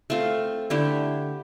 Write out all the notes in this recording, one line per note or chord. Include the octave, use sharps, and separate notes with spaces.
A3 C4 F4 A4
D3 A3 E4 G4